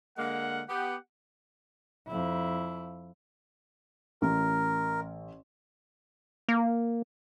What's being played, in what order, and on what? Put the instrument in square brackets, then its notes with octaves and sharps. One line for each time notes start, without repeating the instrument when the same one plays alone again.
[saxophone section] D3 G#3 A#3 [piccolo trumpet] F#5
[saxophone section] B3 G4 [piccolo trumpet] F#5
[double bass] F2 E4
[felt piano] A1 [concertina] A#4
[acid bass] A#3